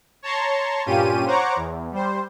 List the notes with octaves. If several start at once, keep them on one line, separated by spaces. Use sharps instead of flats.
C#5 A5 A#5 C6 C#6
G2 A#2 C#4 F4 G4 D#7
C5 C#5 F#5 A#5 C#6 D6
E2
G3 C5